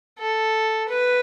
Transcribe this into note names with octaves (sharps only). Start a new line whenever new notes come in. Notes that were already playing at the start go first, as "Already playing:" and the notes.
A4
B4